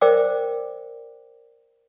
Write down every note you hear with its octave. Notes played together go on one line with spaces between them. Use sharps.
A#4 C5 D5 E5 G5 D6